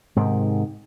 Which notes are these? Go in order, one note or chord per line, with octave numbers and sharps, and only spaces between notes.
G#2 C3 D#3